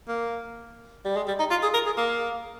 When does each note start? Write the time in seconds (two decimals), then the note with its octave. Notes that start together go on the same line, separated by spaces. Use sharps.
0.08 A#3
1.05 G3
1.16 G#3
1.28 G3
1.39 D#4
1.50 F4
1.63 G#4
1.74 A#4
1.86 G#4
1.97 A#3